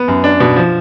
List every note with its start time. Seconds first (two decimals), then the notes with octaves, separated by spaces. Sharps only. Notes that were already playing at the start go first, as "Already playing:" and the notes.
Already playing: B3
0.08 F#2
0.24 D4
0.40 B2
0.56 F3